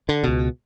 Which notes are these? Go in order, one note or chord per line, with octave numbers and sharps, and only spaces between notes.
D3
C#2 B2